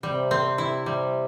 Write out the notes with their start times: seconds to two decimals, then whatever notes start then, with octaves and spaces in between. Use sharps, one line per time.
0.03 C3 G3
0.31 C4
0.58 E4
0.86 G3